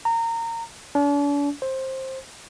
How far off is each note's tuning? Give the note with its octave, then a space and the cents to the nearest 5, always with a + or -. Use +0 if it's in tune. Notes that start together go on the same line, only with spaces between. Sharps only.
A#5 -25
D4 -45
C5 +15